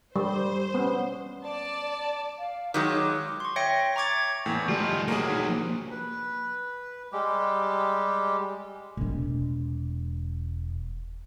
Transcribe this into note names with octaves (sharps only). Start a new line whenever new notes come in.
G3 C5
B3 C#4
D5 A5
F5
D#3 F#3 G#3 D6
C6 C#6
C#5 E5 G5 A#6 C#7
A#5 C#6 D6 G#6 A6
E2 A2 E3 A#3 G5
D#3 F3 G3 A3 F4
D#5
C3 F#3 A#3 G#4
D#4
F3 A#3 D4
B4
G3 G#3 G4
E1 G#3